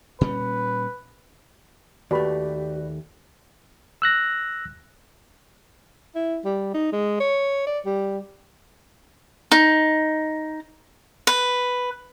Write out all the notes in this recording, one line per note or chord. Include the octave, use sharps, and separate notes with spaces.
A#2 G3 C#4 B4
D#2 A3 F#4 G4 B4 D5 B5
E6 F#6 A#6
E4
G3
D#4
G#3
C#5
D5
G3
D#4
B4